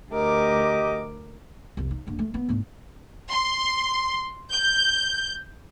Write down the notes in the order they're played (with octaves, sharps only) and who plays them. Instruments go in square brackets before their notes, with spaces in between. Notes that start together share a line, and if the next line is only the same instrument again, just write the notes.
[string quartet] D2 A#4 D6 [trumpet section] G4 D#5
[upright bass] C2 F2
D#4
F#1 D3
A3
B3
D2 G#2
[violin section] C6
G6